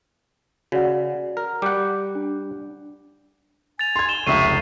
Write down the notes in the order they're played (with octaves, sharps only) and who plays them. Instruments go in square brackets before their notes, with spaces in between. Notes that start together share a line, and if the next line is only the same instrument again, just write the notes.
[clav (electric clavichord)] C#3 [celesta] F#4 D5 F#5
[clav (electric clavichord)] A#4
[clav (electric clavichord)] G3 F#5 [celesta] D6 G6
[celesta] D4
[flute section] G#5 [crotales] A6 F7
[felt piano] C6 G#6
[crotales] E7 G7
[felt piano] F1 C#2 [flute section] E5 C#6 [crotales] C7 D#7